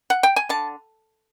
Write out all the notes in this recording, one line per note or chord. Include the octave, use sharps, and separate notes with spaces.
F#5
G5
G#5
D3 A5